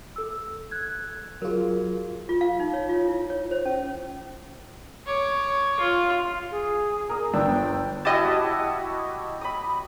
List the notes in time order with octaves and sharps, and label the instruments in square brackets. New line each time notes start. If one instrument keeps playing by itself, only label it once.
[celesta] A4 E6
F#6 G#6
[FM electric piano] F#3 F4 [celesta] G#4 A#4
[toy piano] F4
F5
D#4
C#5
F4
E4
C#5
C5
C#4
[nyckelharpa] C#5 D6
F4
[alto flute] G#4
[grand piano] A#4 D#6
[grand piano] G1 D4 E6 [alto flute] G5
[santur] E4 F#4 G4 [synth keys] D#5 A5
[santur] B5 D#6